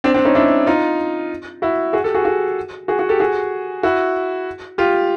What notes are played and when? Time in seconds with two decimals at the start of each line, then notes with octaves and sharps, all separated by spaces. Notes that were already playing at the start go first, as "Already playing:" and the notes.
0.04 C4 D4
0.14 C4 D4
0.25 C#4 D#4
0.35 D4 E4
0.66 D#4 F4
1.62 E4 F#4
1.93 F#4 G#4
2.04 G4 A4
2.15 F#4 G#4
2.25 F#4 G#4
2.88 F#4 G#4
2.99 F#4 G#4
3.09 G4 A4
3.20 F#4 G#4
3.83 E4 F#4
4.78 F4 G4